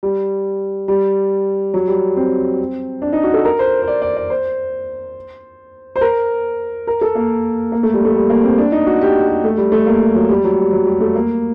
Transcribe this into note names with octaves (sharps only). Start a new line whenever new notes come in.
G3
G3
F#3
G3
C4
D4
D#4
F#4
A4
A#4
C5
C5
D5
D5
D5
C5
C5
A#4
A#4
A4
A#3
A#3
A3
G3
A3
G3
A#3
C4
D4
D#4
F#4
G4
G4
A3
G3
A3
A#3
G3
F#3
G3
F#3
G3
F#3
G3
A3
A#3